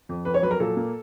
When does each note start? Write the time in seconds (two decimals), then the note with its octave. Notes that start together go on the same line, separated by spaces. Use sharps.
0.09 F2
0.25 F2 B4
0.34 C#5
0.43 F#3 B4
0.51 A#4
0.60 A#2 A4
0.77 A#3